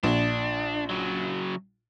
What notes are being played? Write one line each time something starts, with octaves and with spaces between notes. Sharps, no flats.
A#1 D4
C#3 F#3